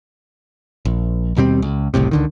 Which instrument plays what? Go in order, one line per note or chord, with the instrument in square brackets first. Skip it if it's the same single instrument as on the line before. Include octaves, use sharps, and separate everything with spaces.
[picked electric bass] A#1
D#2 B2 G3 C4
C#2
F#1 C2 A2 C3
C#2 D3 D#3